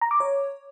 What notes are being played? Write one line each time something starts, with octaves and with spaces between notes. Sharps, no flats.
A#5
D6
C#5